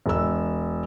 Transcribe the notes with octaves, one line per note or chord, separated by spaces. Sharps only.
E1 E6